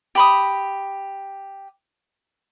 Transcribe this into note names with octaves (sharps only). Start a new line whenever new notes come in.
G4 B5 D#6